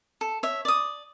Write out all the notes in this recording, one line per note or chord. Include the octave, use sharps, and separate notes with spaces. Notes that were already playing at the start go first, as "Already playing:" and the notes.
A4
C#5 E5
D5 D#6